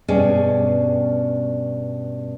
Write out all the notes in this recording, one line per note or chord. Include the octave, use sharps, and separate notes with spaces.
G2 B2 C#4 G#4 D5